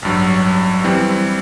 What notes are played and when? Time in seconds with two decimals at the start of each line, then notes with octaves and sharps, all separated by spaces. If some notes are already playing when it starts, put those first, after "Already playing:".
0.02 A1 G2 F#3
0.84 E3 G3 C4